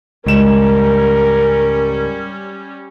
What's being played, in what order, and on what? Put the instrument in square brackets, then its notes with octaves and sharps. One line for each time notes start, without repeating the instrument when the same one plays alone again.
[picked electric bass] C#2 [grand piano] G#2 E7 [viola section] G3 C#4 [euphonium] A#4